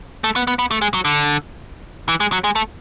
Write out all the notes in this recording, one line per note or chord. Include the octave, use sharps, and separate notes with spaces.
A3
B3
B3
B3
A3
G#3
F#3
D3
E3
G#3
F#3
G#3
A3